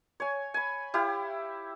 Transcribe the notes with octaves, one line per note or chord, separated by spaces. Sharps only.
C#5 G#5
G#5 B5
E4 G4 F5 G5